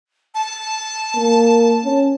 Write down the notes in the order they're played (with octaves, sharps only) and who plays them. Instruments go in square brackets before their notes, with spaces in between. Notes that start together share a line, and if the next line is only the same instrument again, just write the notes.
[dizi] A5
[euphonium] A#3
C#4